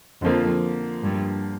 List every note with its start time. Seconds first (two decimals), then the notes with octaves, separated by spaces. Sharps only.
0.22 F2 D3 F3 A#3
1.03 G2